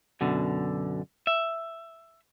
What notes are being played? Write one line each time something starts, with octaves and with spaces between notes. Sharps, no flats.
F#2 B2 D3
E5